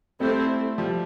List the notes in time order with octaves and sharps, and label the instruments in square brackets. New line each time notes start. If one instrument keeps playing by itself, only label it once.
[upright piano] G3 A3 [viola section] C4 E4 A4 C5
[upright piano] F3 G3